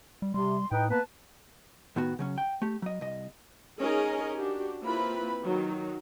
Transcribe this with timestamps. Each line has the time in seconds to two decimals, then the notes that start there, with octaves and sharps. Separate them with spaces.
0.22 G3
0.34 C3 G3 C6
0.72 A2 D#4 B4 G5
0.90 A#3 B3 B4 A5
1.96 A2 D#3 B3 F#4
2.19 C#3 F#3 C#4
2.38 G5
2.62 A3 G4
2.82 F#3 D#5
3.01 C2 D#5
3.80 C#4 D#4 G#4 A#4 D#5 G#5
4.36 D4 F#4 G4
4.83 A#3 C4 E4 F4 B4 B5
5.44 D#3 F#3 D#4